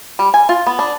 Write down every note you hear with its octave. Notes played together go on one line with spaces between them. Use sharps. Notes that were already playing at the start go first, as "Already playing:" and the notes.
G3
G#5
F4
B3
D4